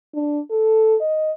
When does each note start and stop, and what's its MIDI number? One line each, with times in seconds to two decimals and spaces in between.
0.14 0.40 62
0.50 0.95 69
1.01 1.32 75